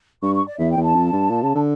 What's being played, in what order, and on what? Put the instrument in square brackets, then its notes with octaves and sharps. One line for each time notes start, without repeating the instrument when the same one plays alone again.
[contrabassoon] G2 [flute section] C#6
[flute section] C#6
D5
[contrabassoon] E2 [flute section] E5
[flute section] G5
[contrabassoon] E2
[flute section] A5
[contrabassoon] F2
G2
A#2
C#3
D3